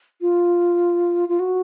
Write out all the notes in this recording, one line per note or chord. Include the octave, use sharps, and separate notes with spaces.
F4
F4
F#4